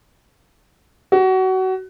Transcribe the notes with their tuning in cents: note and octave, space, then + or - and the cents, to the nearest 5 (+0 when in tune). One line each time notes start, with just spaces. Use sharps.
F#4 +25